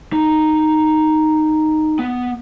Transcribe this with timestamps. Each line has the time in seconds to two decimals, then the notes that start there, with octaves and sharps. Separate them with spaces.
0.13 D#4
1.99 B3